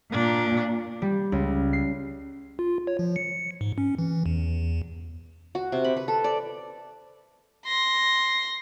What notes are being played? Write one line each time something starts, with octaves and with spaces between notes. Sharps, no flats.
A#2 D4
G3
C#2
C7
F4
C#5
F3
C#7
G#2
C#4
E3
E2
F#4
C3
B5
B4
A4
D5
C6 A#6